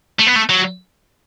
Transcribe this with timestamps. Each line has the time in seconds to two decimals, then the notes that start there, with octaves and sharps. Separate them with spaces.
0.19 A3
0.27 B3
0.36 A3
0.50 F#3